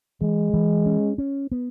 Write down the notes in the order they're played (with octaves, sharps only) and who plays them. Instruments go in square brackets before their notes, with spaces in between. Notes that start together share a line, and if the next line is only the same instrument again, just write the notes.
[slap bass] E3 [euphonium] G#3
[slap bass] E3
C#4
C#4
B3